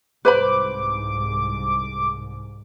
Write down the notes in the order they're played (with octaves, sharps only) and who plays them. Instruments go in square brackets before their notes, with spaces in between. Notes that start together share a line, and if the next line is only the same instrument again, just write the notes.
[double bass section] C2 G#2 [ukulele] B4 C5 B5 [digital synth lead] D6